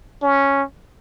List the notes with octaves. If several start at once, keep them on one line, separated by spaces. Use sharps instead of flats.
C#4